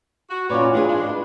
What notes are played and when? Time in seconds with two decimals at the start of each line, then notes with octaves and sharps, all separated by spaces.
0.30 F#4
0.50 A#2 C#4 F4 B4 C#5 D5
0.73 E3 G3 D4 F4 F#4 G#4
0.88 G#3 A#3 D4
1.06 F#4 B4